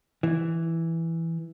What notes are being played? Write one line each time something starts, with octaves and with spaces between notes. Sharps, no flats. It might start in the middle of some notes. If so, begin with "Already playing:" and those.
E3